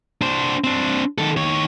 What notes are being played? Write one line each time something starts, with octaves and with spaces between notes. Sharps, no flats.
D4 C5
C4 D4
D#3 A4
D#3 C#5